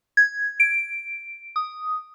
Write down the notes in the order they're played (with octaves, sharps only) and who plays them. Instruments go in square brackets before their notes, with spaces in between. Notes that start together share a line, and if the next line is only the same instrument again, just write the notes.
[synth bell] G#6
D7
D#6